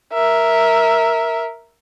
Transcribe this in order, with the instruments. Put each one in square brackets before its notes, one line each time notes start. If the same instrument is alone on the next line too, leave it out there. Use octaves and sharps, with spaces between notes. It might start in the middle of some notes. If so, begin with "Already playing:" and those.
[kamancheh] A#4 E5